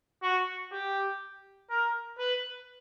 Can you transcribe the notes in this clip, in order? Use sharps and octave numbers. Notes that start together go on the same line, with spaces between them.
F#4
G4
A#4
B4